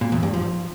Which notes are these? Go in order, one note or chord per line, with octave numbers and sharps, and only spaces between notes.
A#2
E2
G2
F3